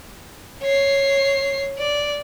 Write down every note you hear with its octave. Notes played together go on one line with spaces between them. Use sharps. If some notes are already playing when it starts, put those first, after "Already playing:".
C#5 C7
D5